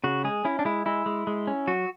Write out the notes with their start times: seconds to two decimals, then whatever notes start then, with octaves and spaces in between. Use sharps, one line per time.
0.04 C#3 F#4
0.24 G#3 G#4
0.45 C#4 E4
0.59 D4
0.65 G#3 E4
0.86 G#3 E4
1.06 G#3
1.27 G#3
1.47 C#4
1.67 F#3 F#4